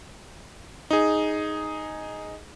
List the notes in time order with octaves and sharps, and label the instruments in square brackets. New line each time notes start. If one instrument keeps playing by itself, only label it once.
[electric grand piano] D#4 G#4